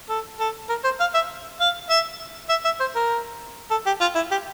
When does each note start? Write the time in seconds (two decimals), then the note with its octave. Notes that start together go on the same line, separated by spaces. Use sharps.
0.10 A4
0.40 A4
0.69 A#4
0.84 C5
1.00 F5
1.14 E5
1.60 F5
1.90 E5
2.50 E5
2.65 E5
2.80 C5
2.95 A#4
3.71 A4
3.86 G4
4.01 F4
4.15 E4
4.31 G4